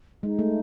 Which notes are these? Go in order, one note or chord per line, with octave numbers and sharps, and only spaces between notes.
G#3 D#4
A3